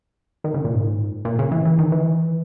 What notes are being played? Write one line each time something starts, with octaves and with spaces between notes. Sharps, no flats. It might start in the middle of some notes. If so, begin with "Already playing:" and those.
D#3
C#3
A#2
G#2
A#2
C#3
E3
E3
D#3
E3